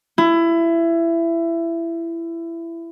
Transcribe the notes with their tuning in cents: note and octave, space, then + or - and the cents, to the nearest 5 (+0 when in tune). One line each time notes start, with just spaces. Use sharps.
E4 +20